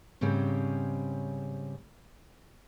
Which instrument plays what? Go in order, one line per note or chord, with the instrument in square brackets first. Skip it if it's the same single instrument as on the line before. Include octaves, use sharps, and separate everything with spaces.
[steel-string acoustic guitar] G#2 C#3 G3 C4 C#4